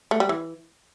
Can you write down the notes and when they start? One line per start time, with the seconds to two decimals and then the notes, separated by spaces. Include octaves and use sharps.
0.11 A3
0.20 G3
0.29 E3